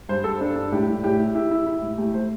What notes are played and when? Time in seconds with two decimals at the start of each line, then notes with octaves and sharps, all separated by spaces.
0.09 G2 C5
0.24 G2 A4
0.41 D4
0.56 D4
0.72 A2 G4
0.88 A2
1.03 A2 G4
1.19 E4
1.35 E4 G4
1.51 E4
1.66 E4
1.82 A2
1.98 A3 G4
2.14 A3 C5